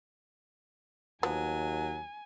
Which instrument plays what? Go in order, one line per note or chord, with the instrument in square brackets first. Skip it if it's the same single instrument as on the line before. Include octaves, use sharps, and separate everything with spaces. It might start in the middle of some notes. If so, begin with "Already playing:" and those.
[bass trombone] D#2 [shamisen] F3 B3 [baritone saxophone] F#3 [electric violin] G#5